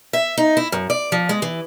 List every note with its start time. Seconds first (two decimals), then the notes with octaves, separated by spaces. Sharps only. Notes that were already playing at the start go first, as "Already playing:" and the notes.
0.13 E5
0.37 D#4
0.57 E4
0.72 F#2
0.90 D5
1.12 F3
1.29 G#3
1.42 E3